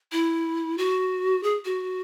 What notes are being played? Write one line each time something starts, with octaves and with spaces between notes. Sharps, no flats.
E4
F#4
G#4
F#4